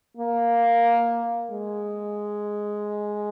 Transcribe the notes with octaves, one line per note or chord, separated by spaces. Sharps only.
A#3
G#3